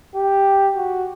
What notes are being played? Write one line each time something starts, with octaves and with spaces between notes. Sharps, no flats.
G4
F#4